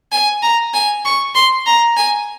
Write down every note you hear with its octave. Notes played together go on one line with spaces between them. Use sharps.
G#5
A#5
G#5
C#6
C6
A#5
G#5